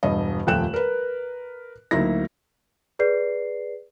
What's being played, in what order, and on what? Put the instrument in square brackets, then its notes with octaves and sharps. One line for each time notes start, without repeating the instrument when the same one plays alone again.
[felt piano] E1 G2 D#5
D#1 F2 A3 G5 F#6 E7
A#4 B4
D2 F#3 A#3 D#4 E4 A#6
[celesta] G#4 B4 D5 C7